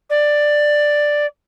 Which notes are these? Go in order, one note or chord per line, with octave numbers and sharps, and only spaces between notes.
D5